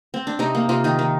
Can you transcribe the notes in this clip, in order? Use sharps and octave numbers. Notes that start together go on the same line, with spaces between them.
C4
D4
C3 D#4
A#3
C3 F4
D#3 D#4
D#3